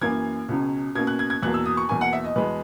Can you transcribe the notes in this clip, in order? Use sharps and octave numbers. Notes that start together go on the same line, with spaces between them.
F#2 E3 A#3 C#4 G#6
C#2 B2 F#3 C#4
B2 A#3 C#4 G#6
F#6
G#6
G#6
E2 B2 F#3 A#3 F#6
E6
D#6
C#6
E2 B2 A#3 G#5
F#5
E5
D#5
E2 B2 G#3 B3 B4